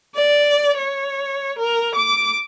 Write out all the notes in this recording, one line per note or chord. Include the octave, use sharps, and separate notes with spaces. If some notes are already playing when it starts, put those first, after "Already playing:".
D5
C#5
A#4
D6